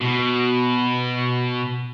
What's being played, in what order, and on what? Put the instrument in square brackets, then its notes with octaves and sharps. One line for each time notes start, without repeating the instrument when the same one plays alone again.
[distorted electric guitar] B2